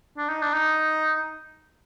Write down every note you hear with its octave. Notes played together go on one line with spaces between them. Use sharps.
D4
D#4
D4
D#4